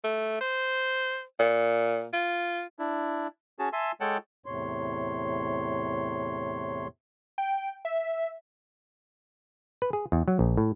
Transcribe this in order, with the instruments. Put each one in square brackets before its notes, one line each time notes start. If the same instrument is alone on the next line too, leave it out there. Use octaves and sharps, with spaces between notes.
[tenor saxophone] A3
C5
A#2
F4
[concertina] D4 E4
C#4 F#4 G#4 A5
E5 G#5 A5 C6 E6
G#3 A4 C#5 F#5 G5 A5
[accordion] E2 A2 C3 C#5 C6
[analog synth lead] G5
E5
[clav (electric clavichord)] B4
G#4
E2
F#3
A#1
A2